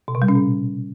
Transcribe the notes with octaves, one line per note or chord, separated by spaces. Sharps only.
B2
C3
G3
C#4
A#2